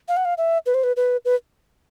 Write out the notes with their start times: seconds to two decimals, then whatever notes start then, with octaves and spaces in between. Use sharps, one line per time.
0.08 F5
0.17 F#5
0.25 F5
0.38 E5
0.66 B4
0.74 C5
0.84 B4
0.97 B4
1.25 B4